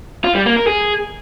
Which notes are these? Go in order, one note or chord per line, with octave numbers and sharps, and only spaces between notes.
F4
G3
A#3
A#4
G#4